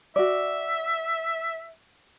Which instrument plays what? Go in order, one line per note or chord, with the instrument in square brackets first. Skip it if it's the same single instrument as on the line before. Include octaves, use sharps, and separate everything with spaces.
[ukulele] F#4 D5 [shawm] E5